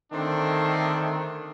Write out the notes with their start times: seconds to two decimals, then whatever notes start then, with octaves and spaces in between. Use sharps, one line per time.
0.13 D3 D#3 A3 C4 D4